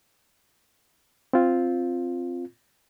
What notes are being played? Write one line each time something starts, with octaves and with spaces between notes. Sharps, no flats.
C4 F4